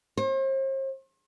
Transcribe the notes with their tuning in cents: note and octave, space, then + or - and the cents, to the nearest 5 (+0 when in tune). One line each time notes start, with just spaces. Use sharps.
C5 +40